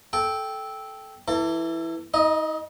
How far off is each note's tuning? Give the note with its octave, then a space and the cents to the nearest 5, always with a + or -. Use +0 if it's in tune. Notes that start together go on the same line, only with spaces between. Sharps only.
A4 -15 G5 +0
E3 +0 A4 +30
D#4 +40 D#5 -5